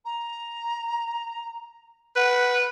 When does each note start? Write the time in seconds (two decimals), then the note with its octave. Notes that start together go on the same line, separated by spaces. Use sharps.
0.05 A#5
2.16 B4 F#5